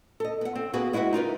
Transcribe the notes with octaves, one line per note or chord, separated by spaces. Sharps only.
A4 D#5
B3 F#5
C4
A#3 B3 F#4 G#4 B4
G#3 E4 F#4 B4 F#5
D#4 F4 A#4 B4